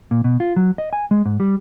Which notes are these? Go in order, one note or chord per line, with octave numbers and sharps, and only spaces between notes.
A#2
B2
F4
F#3
D#5
G#5
G#3
G#2
G3